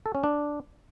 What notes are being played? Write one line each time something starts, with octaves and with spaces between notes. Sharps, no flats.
A4
C#4
D4